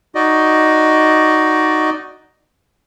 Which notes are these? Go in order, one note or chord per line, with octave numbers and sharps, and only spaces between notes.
D#4 F#4 D5 D#5